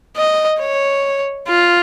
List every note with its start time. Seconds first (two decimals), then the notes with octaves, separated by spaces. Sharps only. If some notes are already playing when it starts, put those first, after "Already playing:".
0.17 D#5
0.60 C#5
1.48 F4